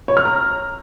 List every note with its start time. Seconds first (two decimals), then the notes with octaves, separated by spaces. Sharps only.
0.08 C#5
0.17 F6
0.25 A#5